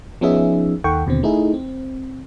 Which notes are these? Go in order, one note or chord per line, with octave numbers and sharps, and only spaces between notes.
F3 B3 C#4 D#4 G#4 E5
D#2 D#3 A4 F#5 G5 C#6
D#2 B2 D3 C4
A3 D#4 E4 G#4
C4